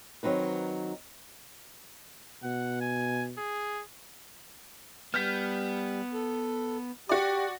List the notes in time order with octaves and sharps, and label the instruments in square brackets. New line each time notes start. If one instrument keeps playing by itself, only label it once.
[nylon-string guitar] D#3 F#3 C4 D#4 B4
[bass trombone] B2 [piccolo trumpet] F#5
[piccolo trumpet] G#5
G#4
[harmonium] G3 [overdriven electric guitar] B3 [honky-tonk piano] F6 G6 B6
[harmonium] A4
[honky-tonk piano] F#4 D5 [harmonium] G4